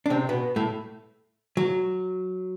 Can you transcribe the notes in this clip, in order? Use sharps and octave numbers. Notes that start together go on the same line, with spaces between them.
D4
C3 C4
B2 B3
A2 A3
F#3